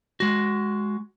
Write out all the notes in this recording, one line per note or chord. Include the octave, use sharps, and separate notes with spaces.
G#3 F#4